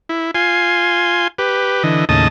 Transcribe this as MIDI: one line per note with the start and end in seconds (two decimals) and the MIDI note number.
0.09 0.31 64
0.35 1.28 65
0.35 1.28 80
0.35 1.28 84
1.38 1.83 67
1.38 1.83 71
1.83 2.05 50
1.83 2.05 52
1.83 2.05 75
2.09 2.28 39
2.09 2.28 45
2.09 2.28 49
2.09 2.28 75
2.09 2.28 81
2.09 2.28 87